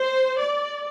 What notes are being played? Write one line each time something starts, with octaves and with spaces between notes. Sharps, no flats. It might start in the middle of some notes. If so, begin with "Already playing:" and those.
Already playing: C5
D5